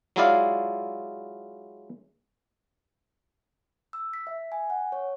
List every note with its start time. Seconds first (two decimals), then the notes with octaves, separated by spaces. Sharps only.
0.16 F#3 G#3 E4 F4 D5 F5
3.93 E6
4.14 B6
4.27 E5
4.52 G#5
4.70 F#5
4.92 C#5